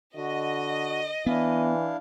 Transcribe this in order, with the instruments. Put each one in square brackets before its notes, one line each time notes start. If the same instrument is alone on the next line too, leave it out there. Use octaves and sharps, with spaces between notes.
[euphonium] D3 [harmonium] F#4 [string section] D#5
[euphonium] E3 [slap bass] B3 [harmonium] D4 E4 F5